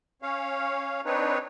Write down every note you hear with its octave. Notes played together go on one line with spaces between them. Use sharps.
C#4 C#5 F5
C4 D4 D#4 B4 C#5